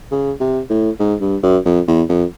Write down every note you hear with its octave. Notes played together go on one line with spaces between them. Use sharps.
C#3
C3
A2
G#2
G2
F#2
F2
E2
F2